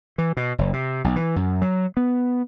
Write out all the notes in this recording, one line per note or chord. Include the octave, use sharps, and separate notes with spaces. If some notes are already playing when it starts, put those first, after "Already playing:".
E3
B2
F#1
C3
B1
E3
F#2
F#3
B3